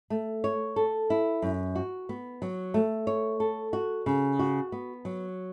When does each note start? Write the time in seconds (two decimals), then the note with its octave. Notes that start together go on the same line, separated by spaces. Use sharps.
0.10 A3
0.44 C#5
0.76 A4
1.10 E4
1.42 F#2
1.75 F#4
2.09 B3
2.42 F#3
2.74 A3
3.07 C#5
3.40 A4
3.73 F#4
4.06 C#3
4.39 F#4
4.72 B3
5.05 F#3